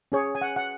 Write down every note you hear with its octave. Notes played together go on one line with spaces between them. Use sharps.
C#4 G#4 C#5
G#5
F#5
F#5